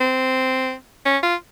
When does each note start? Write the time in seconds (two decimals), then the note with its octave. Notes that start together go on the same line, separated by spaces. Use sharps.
0.01 C4
1.06 C#4
1.23 F4